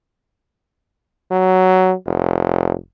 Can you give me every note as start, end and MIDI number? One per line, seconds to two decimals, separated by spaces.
1.31 1.94 54
2.06 2.74 29